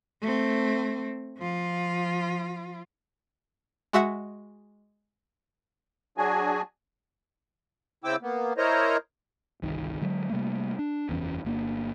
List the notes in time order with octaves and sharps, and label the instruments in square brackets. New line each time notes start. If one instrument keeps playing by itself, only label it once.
[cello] A3 C4
F3 F4
[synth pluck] G#3 F#4 E5 F#5
[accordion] F#3 D4 F#4 G#4 G#5
C#3 C4 E4 G5 D6 E6
A#3 B3
E4 A#4 C5 C#5 D#5 A#5
[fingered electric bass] G1 C2 D#3
D3 F#3 G#3
C3 G3 A3 A#3
D4
F#1 E2 E3 C#4
G1 A#3 D4